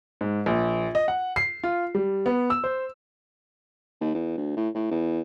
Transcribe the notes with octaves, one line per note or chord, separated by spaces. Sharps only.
G#2
A#1
D#5
F#5
C7
F4
G3
B3
E6
C5
D#2
E2
D2
A2
A2
E2